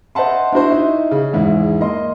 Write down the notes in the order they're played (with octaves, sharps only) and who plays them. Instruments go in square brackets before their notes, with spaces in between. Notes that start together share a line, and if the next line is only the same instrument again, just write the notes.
[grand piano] C5 D#5 E5 F#5 A5 C6
D4 E4 F#4 C5
D#4 E4
C#3
E2 G#2 E4
A#3 D#5 C6